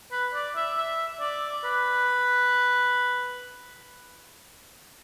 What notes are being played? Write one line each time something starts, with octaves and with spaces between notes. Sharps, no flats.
B4
D5
E5
E5
D5
B4